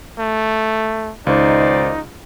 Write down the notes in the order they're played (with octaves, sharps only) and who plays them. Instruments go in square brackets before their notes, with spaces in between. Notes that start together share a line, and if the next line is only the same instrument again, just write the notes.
[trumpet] A3
[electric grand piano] C#2 [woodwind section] D#3 C5 D5 [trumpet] D#4